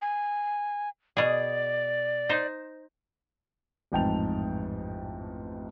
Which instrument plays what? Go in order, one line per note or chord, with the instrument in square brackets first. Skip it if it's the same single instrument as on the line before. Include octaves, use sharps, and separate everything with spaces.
[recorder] G#5
[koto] B2 G#4 [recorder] D5
[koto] D#4 C5
[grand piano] A1 F2 G#2 G5 A5 F7